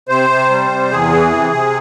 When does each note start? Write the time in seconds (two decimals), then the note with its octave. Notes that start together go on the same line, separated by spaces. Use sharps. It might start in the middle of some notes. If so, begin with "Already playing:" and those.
0.09 C3 C5
0.30 C3
0.50 G3
0.71 C3
0.91 E2 G#4
1.12 E3
1.33 C3
1.53 C3